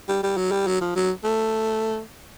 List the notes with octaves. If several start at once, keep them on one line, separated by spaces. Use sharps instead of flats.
G3
G3
F#3
G3
F#3
F3
F#3
A3